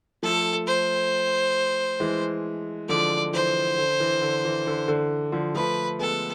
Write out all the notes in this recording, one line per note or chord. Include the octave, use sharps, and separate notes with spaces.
F3 A3 A4
C5
E3 G#3
D3 F3 D5
E3 C5
D3
E3
D3
E3
D3
D3
D3 F3
F3 A3 B4
G#3 B3 A4